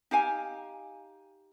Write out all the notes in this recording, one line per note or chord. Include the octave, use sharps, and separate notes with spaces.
D#4 G4 F5 G#5